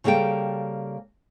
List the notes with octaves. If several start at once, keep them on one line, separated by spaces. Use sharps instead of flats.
C#3 G3 A#3 A4 G5